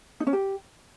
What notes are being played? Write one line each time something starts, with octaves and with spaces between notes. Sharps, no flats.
D#4
C#4
G4